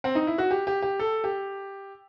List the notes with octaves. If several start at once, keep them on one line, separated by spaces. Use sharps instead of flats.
C4
D#4
E4
F#4
G4
G4
G4
A4
G4